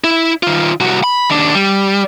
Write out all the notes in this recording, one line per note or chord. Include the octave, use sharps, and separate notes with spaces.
E4
D#3 F4
C2 F#4
B5
D#2 D4
G3